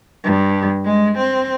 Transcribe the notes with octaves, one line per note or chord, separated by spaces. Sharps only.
G2
G#3
C4